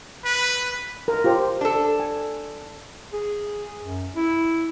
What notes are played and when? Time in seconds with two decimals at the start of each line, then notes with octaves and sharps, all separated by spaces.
0.25 B4
1.08 A#4
1.24 F4 G4 C5
1.61 D4 A4
2.00 G#5
3.13 G#4
3.81 F#2
4.16 E4